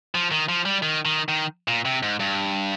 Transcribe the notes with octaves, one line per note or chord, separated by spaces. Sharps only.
F3
D#3
F3
G3
D#3
D#3
D#3
A#2
C3
G#2
G2